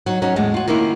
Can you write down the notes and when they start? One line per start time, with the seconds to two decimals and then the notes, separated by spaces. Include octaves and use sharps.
0.06 F#3 D#4
0.22 F#3 C#4 D#4
0.36 E2 A2 G#3
0.54 F4 F#4
0.68 D#3 A#3 B3 C#4 E4 F4